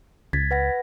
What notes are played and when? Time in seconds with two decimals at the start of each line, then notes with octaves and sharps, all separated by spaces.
0.33 C#2 G#6 A6 B6
0.51 B4 F#5 A#6